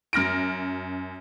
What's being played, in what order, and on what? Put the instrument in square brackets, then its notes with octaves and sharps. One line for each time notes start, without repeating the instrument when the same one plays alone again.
[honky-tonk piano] F#2 F6 A#6 D7